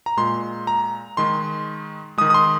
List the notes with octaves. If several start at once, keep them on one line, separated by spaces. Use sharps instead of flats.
A#5
A#2 G#3 C6
A#5
D#3 G#3 C6
D#3 G#3 D#6
D#6
C6